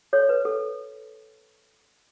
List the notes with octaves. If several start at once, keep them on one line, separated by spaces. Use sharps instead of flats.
A4 C#5
B4
A4